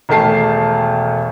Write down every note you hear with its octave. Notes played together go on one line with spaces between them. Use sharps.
E1 D#3 A3 A5 C7